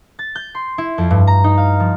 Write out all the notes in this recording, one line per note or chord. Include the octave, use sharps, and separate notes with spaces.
A6
G6
C6
E4
F2
G2
A#5
D#4
F5
F3